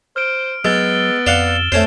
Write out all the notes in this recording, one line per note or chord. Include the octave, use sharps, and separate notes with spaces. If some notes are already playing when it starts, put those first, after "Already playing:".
C5 F6 D7
F#3 G#3 B3 E6 A6 G7
F2 D5 F5 F#5 E7 G7
F2 A3 C#4 C5